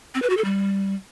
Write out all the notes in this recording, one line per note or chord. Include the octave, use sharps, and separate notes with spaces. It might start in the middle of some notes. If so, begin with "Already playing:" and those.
C4
B4
F#4
A4
G3